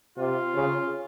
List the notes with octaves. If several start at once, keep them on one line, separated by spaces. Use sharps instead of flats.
C3 F4
C#3